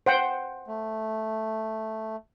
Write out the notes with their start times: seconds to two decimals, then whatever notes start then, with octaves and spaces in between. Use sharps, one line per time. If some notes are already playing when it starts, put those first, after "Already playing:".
0.06 C5 F#5 G5
0.68 A3